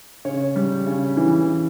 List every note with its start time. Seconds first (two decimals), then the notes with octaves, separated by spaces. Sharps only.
0.25 C#3 C#5
0.56 G3
0.86 C#3
1.17 E3